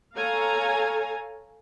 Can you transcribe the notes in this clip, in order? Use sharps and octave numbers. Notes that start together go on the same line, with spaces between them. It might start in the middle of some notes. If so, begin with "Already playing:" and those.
A4 C#5 F5 G#5 A#5